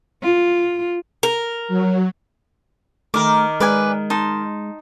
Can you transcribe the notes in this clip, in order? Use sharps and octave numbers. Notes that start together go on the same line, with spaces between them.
F4
A#4
F#3
D#3 A3 A#4 D6
G#3 B4 D5 G#5
D#4 A5 C6